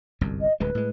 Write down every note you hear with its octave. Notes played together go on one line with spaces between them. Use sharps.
G1 C2 F#2
D#5
D1 D2 G#3 B4
A2 G#3